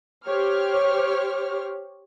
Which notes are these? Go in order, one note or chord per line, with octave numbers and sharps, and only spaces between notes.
G4 C5 C#5 F6